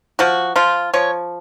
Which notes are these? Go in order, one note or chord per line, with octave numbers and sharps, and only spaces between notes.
F3 F#4
F3 F4
F3 C#5